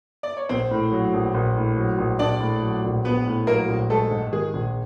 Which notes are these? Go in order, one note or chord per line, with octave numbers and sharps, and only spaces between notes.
D5
C#5
A#1 C4 C5
A2
F#3
A#1
A#1
A2
F#3
A#1
A#1 D4 D5
A2
F#3
A#1
A#1 B3 B4
A2
F#3 A#3 A#4
A#1
G#3 A3 A4
G#2
D#3 G#3 G#4
A#1